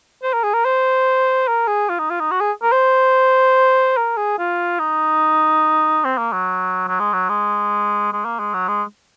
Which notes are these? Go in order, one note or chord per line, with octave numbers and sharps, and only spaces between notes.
C5
A#4
G#4
A#4
C5
A#4
G#4
F4
D#4
F4
D#4
F#4
G#4
A#4
C5
A#4
G#4
F4
D#4
C4
A#3
F#3
F#3
G#3
F#3
G#3
G#3
A#3
G#3
F#3
G#3